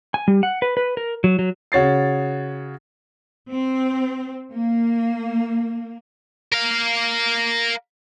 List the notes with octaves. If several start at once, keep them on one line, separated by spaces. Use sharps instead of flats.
G#5
G3
F#5
B4
B4
A#4
F#3
F#3
C#3 F#4 C#5 A6 C7
C4
A#3
A#4 F5